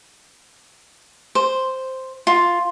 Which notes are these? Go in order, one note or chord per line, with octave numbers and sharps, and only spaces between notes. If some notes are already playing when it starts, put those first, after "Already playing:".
C5
F4